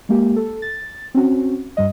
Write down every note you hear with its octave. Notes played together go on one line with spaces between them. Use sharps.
G#3 A#3 G4
A4
A6
C4 C#4 F#4
G2 G3 D#5